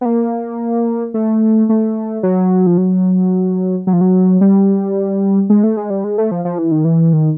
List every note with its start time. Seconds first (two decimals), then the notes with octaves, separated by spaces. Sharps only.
0.01 B3
0.05 A#3
1.14 A3
1.69 A3
2.23 F#3
2.67 F3
2.77 F#3
3.87 F#3
3.93 F3
4.01 F#3
4.41 G3
5.50 G#3
5.64 A3
5.77 G#3
5.90 G3
6.04 G#3
6.18 A3
6.31 F3
6.45 F3
6.59 E3
6.71 D#3
6.85 E3
7.13 D#3